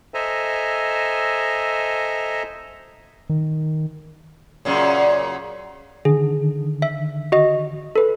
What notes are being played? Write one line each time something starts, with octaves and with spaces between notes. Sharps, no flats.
A4 C5 D#5 E5 G#5 A#5
D#3
F#2 A#2 C#3
D3 D#3 G#4
E5
F#4 D#5
A4 B4